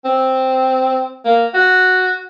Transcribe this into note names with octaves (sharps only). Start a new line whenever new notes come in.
C4
A#3
F#4